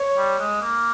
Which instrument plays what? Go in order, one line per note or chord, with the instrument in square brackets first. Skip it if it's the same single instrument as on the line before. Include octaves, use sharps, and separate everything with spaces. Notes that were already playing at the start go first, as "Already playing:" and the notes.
Already playing: [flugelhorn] C#5
[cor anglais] G3
G#3
A#3